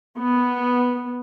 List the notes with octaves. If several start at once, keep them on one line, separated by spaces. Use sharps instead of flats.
B3